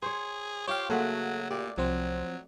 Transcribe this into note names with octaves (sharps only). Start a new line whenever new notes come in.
G#4 C5 C#5
C4 F4 G4 C#5 F5
C#3 F#3 A3 A#3 F#4 A4
A#2 G4 D5
C2 F3 F#3 C4 C5